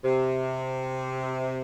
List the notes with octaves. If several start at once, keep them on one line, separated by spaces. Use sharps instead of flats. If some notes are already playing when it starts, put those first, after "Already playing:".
C3